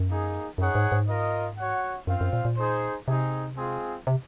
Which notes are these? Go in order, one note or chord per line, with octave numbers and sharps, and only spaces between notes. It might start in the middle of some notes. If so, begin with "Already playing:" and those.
Already playing: F#2
A#3 D#4 G#4
F#2 D#4 G#4 C#5 F#5
G#2
G#2
F4 A#4 D#5
F#4 C#5 F#5
F#2 C4 F4 C5 F5
F#2
A#2
A#2
D#4 G#4 C5
C3 C4 D#4 G#4
G#3 C4 F4 G#4
C3